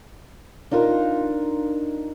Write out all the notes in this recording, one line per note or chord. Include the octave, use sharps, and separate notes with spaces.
D4 D#4 F4 A#4